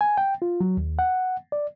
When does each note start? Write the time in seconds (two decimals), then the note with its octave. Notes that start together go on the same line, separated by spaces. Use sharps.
0.01 G#5
0.18 G5
0.42 F4
0.61 F#3
0.77 D#2
0.99 F#5
1.52 D5